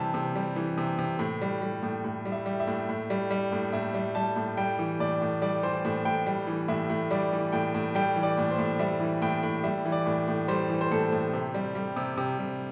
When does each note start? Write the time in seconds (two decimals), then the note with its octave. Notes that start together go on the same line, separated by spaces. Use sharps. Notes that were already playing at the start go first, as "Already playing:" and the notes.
Already playing: C3 E3 G3 A5
0.14 C3
0.35 G3
0.56 E3
0.78 C3
0.98 C3
1.19 A2
1.41 G3
1.62 G3
1.83 A2
2.04 A2
2.25 G3
2.32 E5
2.46 G3
2.60 E5
2.67 A2
2.89 A2
3.10 G3
3.31 G3
3.52 A2
3.73 A2 E5
3.94 G3
4.15 G3 A5
4.36 A2
4.57 G3 G5
4.79 E3
5.00 A2 D5
5.21 A2
5.42 G3 D5
5.63 E3 C5
5.85 A2
6.05 A2 G5
6.27 G3 G5
6.47 E3
6.68 A2 E5
6.90 A2
7.11 G3 D5
7.32 E3
7.53 A2 G5
7.75 A2
7.95 G3 G5
8.16 E3
8.23 D5
8.38 A2
8.51 C5
8.59 A2
8.79 G3 E5
9.00 E3
9.22 A2 G5
9.43 A2
9.64 G3 E5
9.85 E3
9.92 D5
10.06 A2
10.28 A2
10.48 G3 C5
10.70 E3
10.81 C5
10.91 A2 A4
11.12 A2
11.33 C3
11.54 G3
11.75 G3
11.96 C3
12.17 C3
12.39 G3